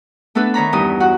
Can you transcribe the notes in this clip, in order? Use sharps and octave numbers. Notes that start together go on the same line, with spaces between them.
A3 B3 D4 A4 B4
D#3 C#5 A#5 B5
E2 G2 D#4 C#5 D#6
F#4 F#5